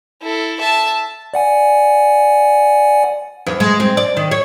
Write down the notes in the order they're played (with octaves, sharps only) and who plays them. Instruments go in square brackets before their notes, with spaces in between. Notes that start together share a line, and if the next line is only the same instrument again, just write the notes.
[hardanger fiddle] E4 A4
E5 A5
[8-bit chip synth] D5 F#5 G#5
[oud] E2
G#3
C4
D5
D#3
C#5